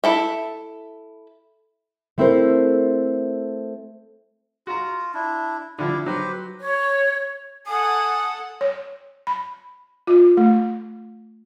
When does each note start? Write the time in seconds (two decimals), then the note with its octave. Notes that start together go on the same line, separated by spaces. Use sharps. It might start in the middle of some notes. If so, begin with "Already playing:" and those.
0.04 E4 A4 E5
2.18 A3 C4 E4 A4 A#4 C5
4.67 F4 F#4 A#5
5.14 D4 E4
5.79 D3 F3 E4 G4
6.06 F#3 G4 B4 C5
6.60 C#5
7.67 A4 F#5 G#5 D#6
8.61 C#5
9.27 B5
10.07 F4
10.37 A3